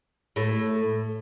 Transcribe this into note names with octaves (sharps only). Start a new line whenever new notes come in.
A2 A3